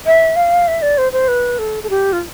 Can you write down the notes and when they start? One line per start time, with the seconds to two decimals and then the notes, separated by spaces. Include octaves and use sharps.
0.06 E5
0.36 F5
0.68 E5
0.82 D5
0.98 C5
1.13 C5
1.28 B4
1.59 A4
1.83 A4
1.90 G4
2.13 F4